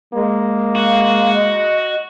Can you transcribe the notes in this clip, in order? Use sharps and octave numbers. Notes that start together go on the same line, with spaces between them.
G#3 A#3
F#4 F5
D#5